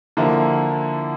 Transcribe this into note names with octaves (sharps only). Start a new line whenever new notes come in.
D3 F3 A#3 E4